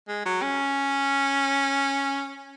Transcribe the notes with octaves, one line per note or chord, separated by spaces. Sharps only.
G#3
F#3
C#4